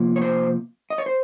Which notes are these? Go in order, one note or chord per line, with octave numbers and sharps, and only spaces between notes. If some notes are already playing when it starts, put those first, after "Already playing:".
Already playing: C3 F3 A#3
C#5
C5
D#5
C#5
C5